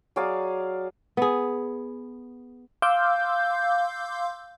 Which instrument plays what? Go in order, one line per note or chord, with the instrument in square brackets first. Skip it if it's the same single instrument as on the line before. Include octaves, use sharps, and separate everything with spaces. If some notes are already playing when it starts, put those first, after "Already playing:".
[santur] F#3 G#4 D5 F5
[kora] B3 G#4
[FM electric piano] F5 C6 D6 E6 G6